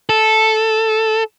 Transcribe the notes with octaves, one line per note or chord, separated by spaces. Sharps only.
A4